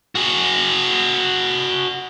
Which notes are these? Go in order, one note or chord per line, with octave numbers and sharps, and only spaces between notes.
F#4 G#4